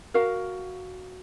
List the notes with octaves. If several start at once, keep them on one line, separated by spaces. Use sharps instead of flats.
F#4 A#4 F5